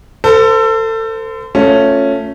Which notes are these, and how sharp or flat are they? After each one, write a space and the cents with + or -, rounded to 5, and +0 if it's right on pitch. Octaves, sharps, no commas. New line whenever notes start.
A4 +30 C5 -30
A3 +10 C#4 +0 F4 +30